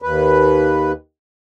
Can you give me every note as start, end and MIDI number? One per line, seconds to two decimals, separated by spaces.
0.02 0.92 39
0.02 0.92 71